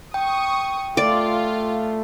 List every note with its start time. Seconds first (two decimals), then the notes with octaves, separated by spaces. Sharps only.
0.14 G5 C#6 D#6
0.97 A3 F4 D5